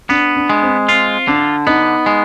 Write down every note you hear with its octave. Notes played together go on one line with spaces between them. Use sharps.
B3 D4
D4
G#3
C4
C4 F4
D3 D4
B3 D#4
G#3